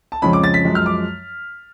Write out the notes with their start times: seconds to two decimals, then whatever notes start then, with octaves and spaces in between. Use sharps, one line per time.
0.12 A5
0.22 F2 C#3 F3 G#3 C#4 B5
0.33 D6
0.44 A6
0.54 B6
0.65 F#2 F3 G#3
0.75 F6
0.86 D6